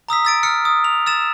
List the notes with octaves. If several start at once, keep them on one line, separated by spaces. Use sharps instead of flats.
A#5 D#6 E6 B6
E6 A6 D7
E6 F6 C#7
D#6
F7
E6 A6 E7